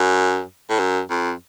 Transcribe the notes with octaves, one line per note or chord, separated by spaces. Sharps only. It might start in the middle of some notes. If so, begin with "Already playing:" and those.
Already playing: F#2
A2
F#2
F2